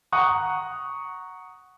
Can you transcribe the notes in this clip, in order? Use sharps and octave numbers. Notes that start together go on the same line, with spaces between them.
F#5 A#5 C#6 D#6 F#6